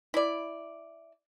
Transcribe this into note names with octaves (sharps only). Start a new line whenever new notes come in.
E4 D5